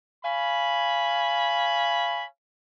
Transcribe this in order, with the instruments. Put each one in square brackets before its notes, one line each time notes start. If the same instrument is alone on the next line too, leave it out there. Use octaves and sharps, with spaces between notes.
[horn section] C#5 F5 G#5 B5